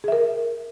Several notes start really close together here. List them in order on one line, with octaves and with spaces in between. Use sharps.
G#4 E5 A#4